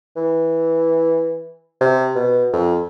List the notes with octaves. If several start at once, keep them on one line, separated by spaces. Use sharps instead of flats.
E3
C3
B2
F2